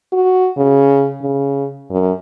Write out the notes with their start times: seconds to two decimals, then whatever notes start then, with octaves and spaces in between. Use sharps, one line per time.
0.13 F#4
0.57 C#3
1.22 C#3
1.91 F#2